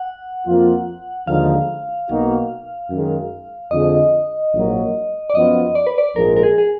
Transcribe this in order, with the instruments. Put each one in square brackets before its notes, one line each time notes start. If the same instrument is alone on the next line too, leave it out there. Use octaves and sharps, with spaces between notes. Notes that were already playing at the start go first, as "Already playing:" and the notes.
Already playing: [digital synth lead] F#5
[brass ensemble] F2 F3 A#3 F4
[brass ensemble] D#2 D3 F3 G#3 D#4 [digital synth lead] F5
[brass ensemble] B1 B2 A#3 D#4 F#4
F#2 D#3 G#3
[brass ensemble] F2 D3 F3 G#3 [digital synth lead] D#5
[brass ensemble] A#1 G#2 F#3 A#3
[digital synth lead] D5
[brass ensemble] F#2 F3 B3 F4 [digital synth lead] D#5
[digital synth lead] D5
B4
D5
[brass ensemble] A#1 G#2 F3 G#3 [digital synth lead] A#4
[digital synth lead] A#4
G#4
G#4